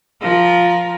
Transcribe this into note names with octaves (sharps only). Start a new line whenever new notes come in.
F3 A#4